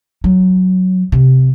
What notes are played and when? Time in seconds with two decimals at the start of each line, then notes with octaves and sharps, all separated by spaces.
0.24 F#3
1.12 C3